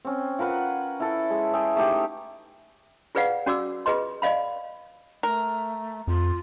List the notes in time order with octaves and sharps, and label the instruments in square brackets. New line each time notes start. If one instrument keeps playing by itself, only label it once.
[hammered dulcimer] C4 C#4
F4 A#4 B4 F#5
E4 A4
G#3
G#4 E5 G5
A3 D#4 G4 E5
[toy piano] F4 G#4 B4 D5 F5 F#5
C#4 F#4 D5 D6 E6
F4 G#4 B4 D#5 C6
D5 D#5 F5 B5
[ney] A3 [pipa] A#4
[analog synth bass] F2 [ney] F4